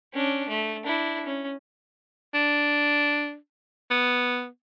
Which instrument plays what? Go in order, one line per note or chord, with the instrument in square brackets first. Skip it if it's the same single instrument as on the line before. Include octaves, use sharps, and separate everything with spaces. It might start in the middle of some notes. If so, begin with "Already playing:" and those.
[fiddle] C#4 D4
A3
D4 E4
C#4
[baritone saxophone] D4
B3